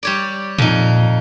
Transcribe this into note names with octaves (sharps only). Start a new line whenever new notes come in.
G3 C#5 D5
F2 A#2 D#4